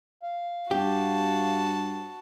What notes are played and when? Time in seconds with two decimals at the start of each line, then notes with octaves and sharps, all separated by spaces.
0.23 F5
0.71 G2 F#4 G4 A5